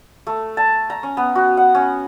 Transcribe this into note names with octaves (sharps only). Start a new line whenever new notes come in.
A3
A5
A#5
C#4
B3
F#4
F#5
C#4